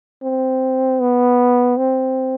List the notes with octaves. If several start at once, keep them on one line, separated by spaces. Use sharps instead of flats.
C4
B3
C4